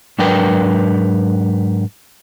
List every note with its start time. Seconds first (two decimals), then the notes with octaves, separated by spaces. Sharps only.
0.19 G#2 F#3 D4 A#4 B4 G5